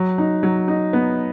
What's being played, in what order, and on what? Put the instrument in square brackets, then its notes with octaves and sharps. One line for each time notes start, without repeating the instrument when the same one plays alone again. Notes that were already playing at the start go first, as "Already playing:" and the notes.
Already playing: [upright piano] F#3
D#4
F#3
D#4
B3